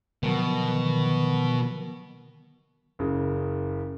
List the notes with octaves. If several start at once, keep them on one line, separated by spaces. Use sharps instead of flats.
B2 D3 D#3 F3 F#3
F#1 C#3